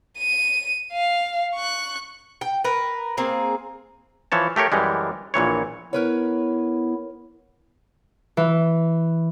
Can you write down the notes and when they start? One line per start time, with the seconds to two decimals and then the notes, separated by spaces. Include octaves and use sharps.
0.18 D#7
0.93 F5
1.55 C#6 F#6
2.41 G5
2.64 A#4 B4
3.17 A#3 C4 G#4
4.32 E3 F3 C#5 A5
4.56 A3 G4 A#4 C#5
4.72 F#2 E3 G3 G#3
5.34 A#1 A#2 E3 C#5
5.93 B3 E4 A#4 B4 C#5
8.37 E3